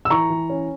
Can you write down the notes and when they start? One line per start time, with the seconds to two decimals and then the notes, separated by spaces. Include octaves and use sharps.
0.05 E6
0.10 E3 A#5 C#6
0.30 E3
0.50 C#4